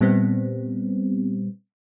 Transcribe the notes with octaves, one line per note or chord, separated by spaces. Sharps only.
A#2 G3 B3 C4